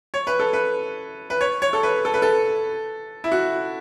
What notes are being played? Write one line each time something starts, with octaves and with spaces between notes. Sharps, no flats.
C#5
B4
A4
B4
B4
C#5
C#5
A4
B4
A4
B4
A4
E4
F#4